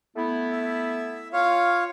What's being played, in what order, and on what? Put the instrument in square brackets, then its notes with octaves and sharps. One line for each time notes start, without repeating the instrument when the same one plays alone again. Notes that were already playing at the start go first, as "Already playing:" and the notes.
[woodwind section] A3 B3 E4
[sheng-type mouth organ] E5
F4 C#5 F5